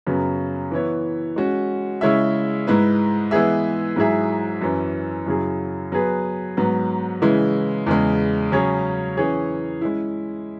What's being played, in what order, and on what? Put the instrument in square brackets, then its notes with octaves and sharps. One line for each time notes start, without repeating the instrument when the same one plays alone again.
[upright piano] F#2 C#3 F#3 B3
E3 B3 E4 C#5
G#3 C#4 F#4
C#3 G#3 E4 C#5 E5
G#2 G#3 E4 B4
E3 G#3 B3 G#4 E5
G#2 F#3 E4 G#4 E5
F#2 E3 C#4
F#2 C#3 F#3 E4 G#4
F#3 B3 G#4 B4
G#2 F#3 B3
C#3 E3 G#3 E4
E2 C#3 G#3
C#3 F#3 C#4 G#4 C#5
E3 C#4 G#4 C#5
G#3 C#4 E4